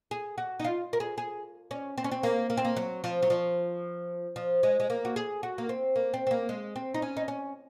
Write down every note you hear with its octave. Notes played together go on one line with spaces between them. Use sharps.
G#4
F#4
D#4
F4
A#4
G#4
G#4
C#4
C4
C#4
C4
A#3
A#3
C4
A#3
F#3
F3
F#3
F3
F3
G#3
G#3
A#3
F#4
G#4
F#4
A#3
C4
A#3
C4
C4
A#3
G#3
C4
D#4
C#4
D#4
C#4